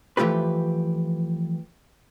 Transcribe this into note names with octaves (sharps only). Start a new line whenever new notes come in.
E3 F3 A3 F4 G4 B4